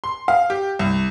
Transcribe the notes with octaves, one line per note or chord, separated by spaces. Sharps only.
C6
F5
G4
C2